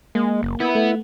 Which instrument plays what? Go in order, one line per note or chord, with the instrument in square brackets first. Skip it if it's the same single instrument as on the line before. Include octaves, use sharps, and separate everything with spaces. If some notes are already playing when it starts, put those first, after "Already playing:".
[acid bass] G#3 [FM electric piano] A#3
[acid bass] F#1
[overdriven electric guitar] B3 [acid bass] E4
[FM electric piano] A3